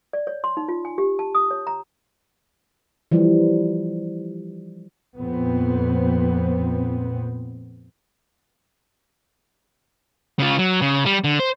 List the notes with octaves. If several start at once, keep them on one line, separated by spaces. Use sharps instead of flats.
D5
C#5
C6
D#4
F4
G#5
G4
A5
D#6
C#5
A#5
E3 F3 G3
F2 A#2 B3 C4
C#3 F4
F#3
C#3
G3
D3
C5